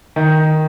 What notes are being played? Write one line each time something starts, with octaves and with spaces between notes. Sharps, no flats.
D#3